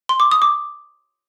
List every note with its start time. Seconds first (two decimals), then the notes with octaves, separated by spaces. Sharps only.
0.09 C6
0.20 D6
0.32 D#6
0.42 D6